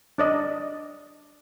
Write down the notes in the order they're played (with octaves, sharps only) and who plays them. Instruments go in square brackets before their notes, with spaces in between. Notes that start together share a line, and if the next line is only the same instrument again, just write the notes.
[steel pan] D4 D5 D#5